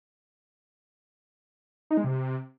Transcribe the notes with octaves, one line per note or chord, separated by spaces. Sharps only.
D#4
G#3
C3